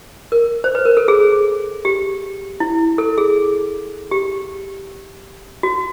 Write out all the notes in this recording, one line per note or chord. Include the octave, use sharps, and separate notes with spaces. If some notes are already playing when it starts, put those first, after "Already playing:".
A#4
C5
B4
A#4
A4
G#4
G4
E4
A4
G#4
G4
F#4